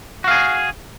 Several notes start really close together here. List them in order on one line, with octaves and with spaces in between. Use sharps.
F#4 F5 G#4